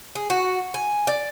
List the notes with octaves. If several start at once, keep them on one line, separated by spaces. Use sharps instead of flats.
G#4
F#4
G#5
D5